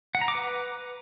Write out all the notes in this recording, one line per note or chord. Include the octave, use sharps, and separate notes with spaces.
F#5
A#5
D6
B4